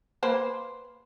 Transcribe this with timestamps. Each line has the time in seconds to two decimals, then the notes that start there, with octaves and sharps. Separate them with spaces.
0.23 A#3 B4 C5